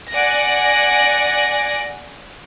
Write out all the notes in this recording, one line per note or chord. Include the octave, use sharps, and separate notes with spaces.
D5 F#5 G#5 F#6 A#6 D7